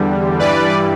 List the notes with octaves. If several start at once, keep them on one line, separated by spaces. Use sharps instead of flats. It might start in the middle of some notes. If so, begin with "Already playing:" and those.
Already playing: E2 D3 G3
G2 E3 G3 B4 D5